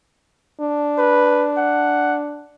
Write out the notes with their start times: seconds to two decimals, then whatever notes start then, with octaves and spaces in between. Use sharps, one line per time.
0.61 D4
0.98 B4
1.57 F#5